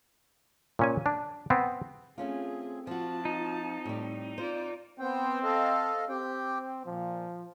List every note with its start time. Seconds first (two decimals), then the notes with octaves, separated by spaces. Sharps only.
0.79 A#2 C#4 G#5
1.06 D4
1.50 B3 C4
2.18 A3 C4 C#4 F4 G#4
2.87 F3 F4 F#4 A5
3.25 D#4
3.85 A2 G3
4.38 F4 C5 D5
4.99 B3 C4 C5 G5
5.44 A4 D#5 F5
6.09 C4 G4 G5
6.86 A#2 F3